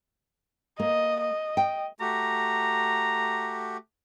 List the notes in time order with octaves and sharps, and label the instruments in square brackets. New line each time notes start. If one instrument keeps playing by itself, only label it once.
[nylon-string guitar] A#3 [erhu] D#5
[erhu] D#5
[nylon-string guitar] G5
[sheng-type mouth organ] A3 F#4 G4 [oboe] A#5